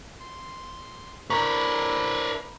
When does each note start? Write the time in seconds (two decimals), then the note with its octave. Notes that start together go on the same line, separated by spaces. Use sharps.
0.20 C6
1.30 D4 E4 A#4 B4 A#5 B5 C#6